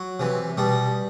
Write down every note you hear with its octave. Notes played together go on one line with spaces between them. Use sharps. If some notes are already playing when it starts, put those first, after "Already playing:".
Already playing: F#3
C3 E3
B2 G3